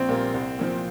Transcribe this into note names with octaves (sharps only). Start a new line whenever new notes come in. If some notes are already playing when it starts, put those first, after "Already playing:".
Already playing: A#1 C4
A#2 G3 A#3
C2
A#2 F3 C4